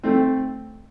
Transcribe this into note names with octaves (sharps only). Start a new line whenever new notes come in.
A3 C4